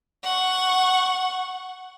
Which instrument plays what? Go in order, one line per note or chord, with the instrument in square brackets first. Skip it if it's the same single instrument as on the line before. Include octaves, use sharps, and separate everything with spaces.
[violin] F#5 C#6